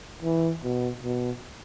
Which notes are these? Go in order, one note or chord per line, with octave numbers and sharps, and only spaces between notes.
E3
B2
B2